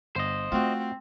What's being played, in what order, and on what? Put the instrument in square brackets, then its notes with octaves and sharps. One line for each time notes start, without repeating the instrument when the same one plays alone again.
[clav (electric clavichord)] G1 [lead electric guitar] C5 D#5
[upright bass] A3 [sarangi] C4 [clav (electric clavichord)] F4 F#4